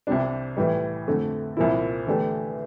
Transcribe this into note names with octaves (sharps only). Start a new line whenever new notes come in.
C2 C3 G3 D4
A2 E3 G3
F2 D3 A3
C2 A#2 F3 A#3 E4
E2 D3 A3 D4 G4